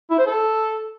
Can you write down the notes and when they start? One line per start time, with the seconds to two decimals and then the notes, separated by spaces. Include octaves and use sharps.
0.11 E4
0.19 C5
0.27 A4